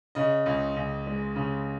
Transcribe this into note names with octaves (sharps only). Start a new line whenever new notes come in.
C#3 D#5
C#2
C#2
G#3
C#3